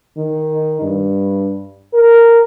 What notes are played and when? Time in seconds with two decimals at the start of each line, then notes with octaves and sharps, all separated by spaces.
0.17 D#3
0.81 G2
1.94 A#4